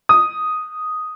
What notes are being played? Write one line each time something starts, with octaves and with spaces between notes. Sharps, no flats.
D#6